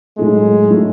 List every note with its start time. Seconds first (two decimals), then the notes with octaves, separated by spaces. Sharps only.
0.17 A2 F#3 G#3 A3 E4 A4
0.70 A2 F#3 A3 E4 A4